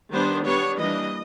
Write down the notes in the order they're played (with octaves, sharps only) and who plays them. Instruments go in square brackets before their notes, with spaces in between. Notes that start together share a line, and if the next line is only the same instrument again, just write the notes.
[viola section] D#3 G3 B3 D4 C5
G3 B3 D4 C#5
E3 G3 A#3 D4 D#5